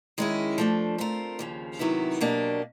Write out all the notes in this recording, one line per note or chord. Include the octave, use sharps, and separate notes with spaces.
D#3 G#3 C#4 E4 G#4
F3 A3 D4
A3 C4 F4 A#4
D#2 C#3 F3
C3 D#3 F#3 B3 E4
B2 F#3 A#3 D4 G4